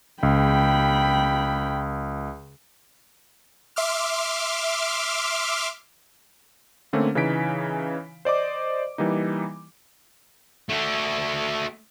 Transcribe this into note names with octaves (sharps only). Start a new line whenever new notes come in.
C#2 G5 B5
E5 C6 D6 F6
D3 A3 A#3 C4 C#4
C#3 E3 D#4 G#5 B6 D7
C5 D5 D#5 D6
E3 G3 A#3 D#4
A3 F#4